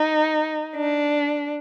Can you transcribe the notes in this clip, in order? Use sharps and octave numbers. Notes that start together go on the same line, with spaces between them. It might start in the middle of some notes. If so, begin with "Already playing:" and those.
Already playing: D#4
D4